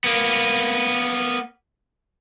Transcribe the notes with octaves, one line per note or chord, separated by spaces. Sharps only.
A#3 B3